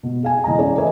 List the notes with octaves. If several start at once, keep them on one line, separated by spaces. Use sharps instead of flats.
B2
G#4 F5 G#5
E1 E3 D#5 F5 A#5
E3 C#4 E4 G#4 C#5 D5
A4 B4 C#5 D#5 E5 G#5